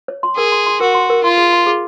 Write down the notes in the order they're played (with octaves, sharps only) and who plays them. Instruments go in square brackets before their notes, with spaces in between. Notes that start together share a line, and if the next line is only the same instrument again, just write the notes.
[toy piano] C#5
C6
[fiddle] G#4 [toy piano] A#4
[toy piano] C6
C6
[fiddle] F#4 [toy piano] A#4
[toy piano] C6
A#4
[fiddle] F4 [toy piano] C6
[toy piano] G#4
C6
G#4